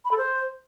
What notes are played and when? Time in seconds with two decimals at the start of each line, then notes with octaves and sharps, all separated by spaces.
0.05 B5
0.11 A4
0.18 C5